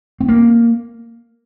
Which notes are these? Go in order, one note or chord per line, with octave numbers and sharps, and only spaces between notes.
C4
A#3